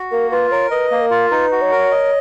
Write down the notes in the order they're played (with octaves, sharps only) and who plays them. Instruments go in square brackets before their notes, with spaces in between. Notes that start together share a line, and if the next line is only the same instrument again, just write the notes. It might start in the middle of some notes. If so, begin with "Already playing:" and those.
Already playing: [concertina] F#4
[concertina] A#3 [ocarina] A#4
[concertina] F4 [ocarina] B4
[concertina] A#4 [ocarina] C#5
[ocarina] B4 [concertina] D#5
[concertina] A#3
[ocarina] A#4
[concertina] F4
[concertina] D#4 [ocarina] B4
[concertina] F#4
[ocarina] C#5
[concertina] A#4
D#5